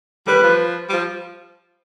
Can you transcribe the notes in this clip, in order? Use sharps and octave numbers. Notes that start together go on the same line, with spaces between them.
G3 B4
F3
G3
F3